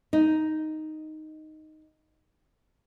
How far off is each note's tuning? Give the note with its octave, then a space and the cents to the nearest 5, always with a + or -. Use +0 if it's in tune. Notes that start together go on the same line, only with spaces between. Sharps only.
D#4 +0